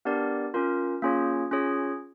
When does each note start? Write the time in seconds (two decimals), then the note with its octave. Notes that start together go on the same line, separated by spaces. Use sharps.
0.05 B3 D4 G4 A#4 D5
0.54 C#4 F4 A#4
1.02 A#3 C#4 F4 G#4 C#5
1.51 C#4 F4 G#4 C#5